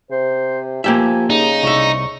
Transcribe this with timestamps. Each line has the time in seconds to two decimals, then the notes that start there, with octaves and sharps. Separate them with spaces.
0.11 C3 C5
0.84 F3 A#3 G4 E5 G#5
1.30 C#3 D#4
1.63 C2 E5 C#6